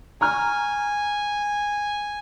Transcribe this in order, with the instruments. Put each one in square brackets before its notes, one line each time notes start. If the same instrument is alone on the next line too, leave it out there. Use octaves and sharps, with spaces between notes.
[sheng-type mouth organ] G#5 [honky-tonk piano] A#5 C#6 F6